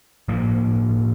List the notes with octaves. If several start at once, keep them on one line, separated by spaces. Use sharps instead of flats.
A2 F3 A#3